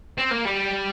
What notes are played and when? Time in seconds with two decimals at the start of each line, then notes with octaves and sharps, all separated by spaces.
0.18 C4
0.31 A#3
0.45 G3